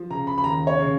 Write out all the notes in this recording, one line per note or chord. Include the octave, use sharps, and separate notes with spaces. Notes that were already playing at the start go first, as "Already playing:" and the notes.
Already playing: F3
C#3 A#5
B5
B5
D#2 A#5
C#5
C#3